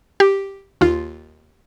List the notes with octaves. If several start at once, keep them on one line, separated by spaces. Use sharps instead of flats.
G4
D#2 F4